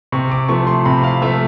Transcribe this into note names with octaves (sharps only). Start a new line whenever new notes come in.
C3 C#6
D6
F3 A3 C#6
C6
C3 B5
F5
F3 A3 E5